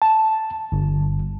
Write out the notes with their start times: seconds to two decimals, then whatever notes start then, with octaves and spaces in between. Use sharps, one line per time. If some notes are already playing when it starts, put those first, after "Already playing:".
0.02 A5
0.72 G1